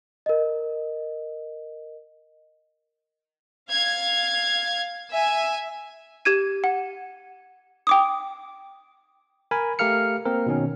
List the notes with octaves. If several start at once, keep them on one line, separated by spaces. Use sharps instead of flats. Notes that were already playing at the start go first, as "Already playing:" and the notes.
A#4 D#5
F5 G#6
E5 G#5
G4 G#6 D#7
F#5
G5 D6 D#6
A#4 G#5 B5
A3 G4 A#4 F5 F6 C#7
A#3 C4 A#4
B2 D#3 C#4